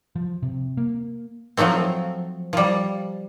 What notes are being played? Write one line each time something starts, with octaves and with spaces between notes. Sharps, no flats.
F3
C3
A#3
F3 F#3 A3 C4
F3 G3